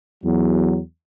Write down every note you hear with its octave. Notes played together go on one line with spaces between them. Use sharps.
E2 F#3